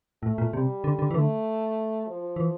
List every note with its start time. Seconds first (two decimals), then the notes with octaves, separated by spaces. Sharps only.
0.22 A2 A3
0.38 A#2
0.53 C3 G3
0.84 D3
0.99 D3
1.11 E3
1.15 D3 A3
2.07 F3
2.36 E3